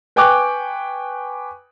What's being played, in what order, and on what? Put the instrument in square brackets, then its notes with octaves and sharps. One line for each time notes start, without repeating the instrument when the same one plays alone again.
[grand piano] B4 G5 G#5 C#6 D6 F#6